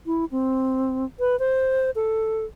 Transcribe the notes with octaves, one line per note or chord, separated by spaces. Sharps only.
E4
C4
B4
C5
A4